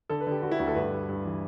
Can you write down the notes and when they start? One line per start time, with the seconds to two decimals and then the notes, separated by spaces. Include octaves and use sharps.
0.10 D3 A4
0.21 B4
0.27 D3 G4
0.42 D3 F#4
0.51 E4
0.59 D2 F#4
0.68 A4
0.75 G2 B4
0.92 G2
1.09 G2
1.25 E3